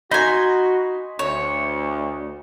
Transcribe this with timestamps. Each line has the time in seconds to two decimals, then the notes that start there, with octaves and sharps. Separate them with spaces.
0.11 D#4 F#4 D#5 G#5 B5 C6
1.19 D2 C#5